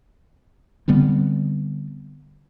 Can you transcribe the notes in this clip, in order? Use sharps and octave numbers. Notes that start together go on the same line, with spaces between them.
D3 G3 B3 C4